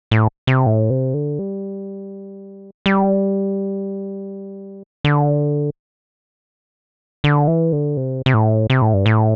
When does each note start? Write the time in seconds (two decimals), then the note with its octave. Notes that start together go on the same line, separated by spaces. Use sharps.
0.11 A2
0.47 C3
0.66 A2
0.90 C3
1.14 D3
1.39 G3
2.86 G3
5.04 D3
7.24 D3
7.47 E3
7.72 D3
7.97 C3
8.26 C3
8.34 A2
8.70 C3
8.82 A2
8.94 G2
9.06 A2